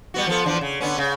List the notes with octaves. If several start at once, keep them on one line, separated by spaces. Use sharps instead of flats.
G3 B3 F#4
F3 B3 A4
E2 F3 D4
C#3
D3 B3 C#4
C#3